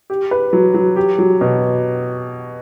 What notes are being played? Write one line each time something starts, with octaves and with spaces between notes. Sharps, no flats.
G4
B4
F#3
F#3
G4
F#3
B2